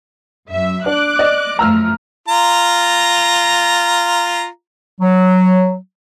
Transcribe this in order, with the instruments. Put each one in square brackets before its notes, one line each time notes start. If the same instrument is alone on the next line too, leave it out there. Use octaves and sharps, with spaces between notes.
[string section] F#2 E5
[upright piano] D4 [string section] D6 F#6
[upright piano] D5 D#5
[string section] F#2 F3 A3 [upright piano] A#5 E6 F6
[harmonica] F4 A#5
[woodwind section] F#3